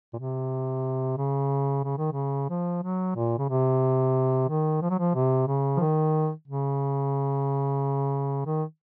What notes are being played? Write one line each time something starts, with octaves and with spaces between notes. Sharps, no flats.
A#2
C3
C#3
C#3
D#3
C#3
F3
F#3
A#2
C#3
C3
D#3
F3
F#3
F3
C3
C#3
F3
D#3
C#3
D#3